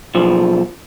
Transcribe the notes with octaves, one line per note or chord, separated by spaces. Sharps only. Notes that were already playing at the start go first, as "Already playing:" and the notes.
B1 F3